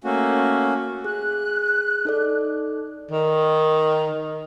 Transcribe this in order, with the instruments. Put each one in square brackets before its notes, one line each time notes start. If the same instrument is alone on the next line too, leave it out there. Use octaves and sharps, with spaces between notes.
[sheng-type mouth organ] A3 A#3 C#4 F#4
[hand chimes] G#4 [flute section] F#6
[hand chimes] D#4 A4 D5
[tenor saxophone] D#3